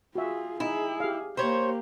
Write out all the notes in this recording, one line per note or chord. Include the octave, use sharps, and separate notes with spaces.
F4 F#4 G#4 E5
D#4 E4 G#4
G4 F5
A#3 G4 C5 C#5 B5